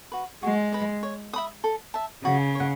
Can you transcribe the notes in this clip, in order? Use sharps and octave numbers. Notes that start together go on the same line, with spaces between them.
F#4 B4
G#3 F#4
B4 D#5
C#5
E5 B5 D#6
A4
E5 A5
C#3 F#4
C#5 F#5